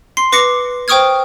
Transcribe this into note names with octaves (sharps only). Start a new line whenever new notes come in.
C6 C7
B4 D6 A#6 C7 C#7
C5 G5 C#6 D#6 F6 G#6